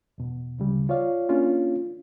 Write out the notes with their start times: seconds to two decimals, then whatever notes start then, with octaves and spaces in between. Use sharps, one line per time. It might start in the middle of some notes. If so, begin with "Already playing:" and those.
0.18 E2 B2
0.58 D2 C#3 G3
0.89 F4 C#5 D5 F5
1.29 A#3 C#4 D4 F4